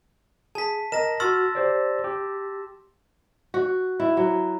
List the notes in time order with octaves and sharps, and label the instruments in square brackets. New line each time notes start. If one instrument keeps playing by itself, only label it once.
[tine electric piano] G#4 [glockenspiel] A5 B6
[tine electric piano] A#4 D#5 A#5 [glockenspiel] A#6 E7
[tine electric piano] F#4 C#6 F6 [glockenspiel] C6 E6 A6
[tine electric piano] G4 C5 D5
G4
[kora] F#4
E4
F#3